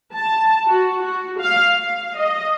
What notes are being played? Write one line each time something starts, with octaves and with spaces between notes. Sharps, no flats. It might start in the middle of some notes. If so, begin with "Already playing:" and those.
A5
F#4
F#4
F5
F5
D#5